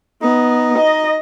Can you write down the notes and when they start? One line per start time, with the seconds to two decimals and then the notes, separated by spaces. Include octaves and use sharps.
0.22 B3 D#4
0.79 D#5